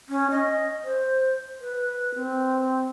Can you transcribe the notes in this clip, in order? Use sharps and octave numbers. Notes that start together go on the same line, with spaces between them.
C#4
D#5
C5
B4
C4